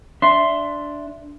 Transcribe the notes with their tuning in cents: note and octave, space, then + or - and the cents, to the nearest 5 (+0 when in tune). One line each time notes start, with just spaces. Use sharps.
D4 +0 E5 +15 C6 +0